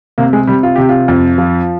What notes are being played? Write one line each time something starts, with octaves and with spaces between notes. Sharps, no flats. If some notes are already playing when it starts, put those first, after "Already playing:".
C3 A#3
G#3
C3 G3
F4
C3 G4
F4
F2
F3